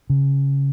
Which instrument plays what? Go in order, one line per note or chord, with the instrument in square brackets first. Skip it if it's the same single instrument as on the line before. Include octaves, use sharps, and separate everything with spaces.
[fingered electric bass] C#3